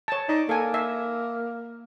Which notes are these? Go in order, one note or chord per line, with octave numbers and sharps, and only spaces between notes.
C#5 A5
D#4 D5
A#3 A4 G#5
E5